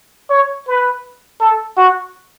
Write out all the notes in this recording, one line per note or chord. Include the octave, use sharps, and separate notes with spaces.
C#5
B4
A4
F#4